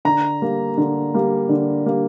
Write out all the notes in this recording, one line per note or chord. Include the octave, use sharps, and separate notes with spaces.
D3 A#5
G3 A#3
D3
G3 A#3
D3
G3 A#3